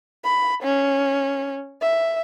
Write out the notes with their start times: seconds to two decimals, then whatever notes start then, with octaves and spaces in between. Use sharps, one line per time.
0.25 B5
0.63 C#4
1.82 E5